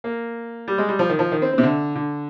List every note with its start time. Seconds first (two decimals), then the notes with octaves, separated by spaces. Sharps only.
0.04 A#3
0.68 G3
0.78 G#3
0.89 G3
0.99 F3
1.09 D#3
1.19 F3
1.32 D#3
1.42 C4
1.53 C4
1.58 C3
1.63 D3
1.95 D3